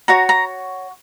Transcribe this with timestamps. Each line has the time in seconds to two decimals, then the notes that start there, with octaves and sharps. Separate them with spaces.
0.08 F#4 C#5 A#5
0.29 A#5